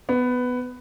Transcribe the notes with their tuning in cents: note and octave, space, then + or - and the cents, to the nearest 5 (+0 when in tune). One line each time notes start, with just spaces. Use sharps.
B3 +10